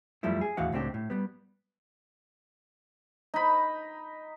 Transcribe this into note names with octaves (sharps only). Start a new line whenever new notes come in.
F#2 F3 G3 A3 E4
G#4
D#2 A2 E3 F#4 F5 F#5
C#2 A2 C4 D4 F4 G4
A2
G3 B3
D#4 B5